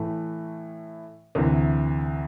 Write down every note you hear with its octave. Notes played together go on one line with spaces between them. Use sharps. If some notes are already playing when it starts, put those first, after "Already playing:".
Already playing: A2 E3 A3
D2 C3 E3